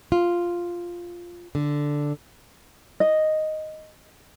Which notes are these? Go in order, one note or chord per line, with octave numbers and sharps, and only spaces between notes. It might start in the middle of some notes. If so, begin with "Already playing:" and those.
F4
D3
D#5